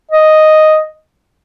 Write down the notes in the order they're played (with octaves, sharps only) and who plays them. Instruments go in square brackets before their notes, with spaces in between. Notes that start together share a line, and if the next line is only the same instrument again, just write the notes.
[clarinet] D#5